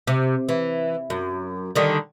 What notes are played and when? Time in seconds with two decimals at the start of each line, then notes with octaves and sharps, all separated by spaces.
0.07 C3
0.49 E3
1.10 F#2
1.75 D3 D#3 G3